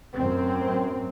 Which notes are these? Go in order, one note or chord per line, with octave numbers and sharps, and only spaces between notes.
F#2 A2 C4